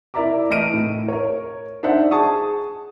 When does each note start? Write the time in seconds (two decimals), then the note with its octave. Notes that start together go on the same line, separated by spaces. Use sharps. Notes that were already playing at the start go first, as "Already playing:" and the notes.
0.14 E4 A#4 D5 E5 A#5 D6
0.50 E3 A3 D#5 F6 D7 D#7
0.74 A2
1.08 A#4 C#5
1.83 D4 D#4 C5 E5 F#5
2.11 G#4 A5 C#6 D#6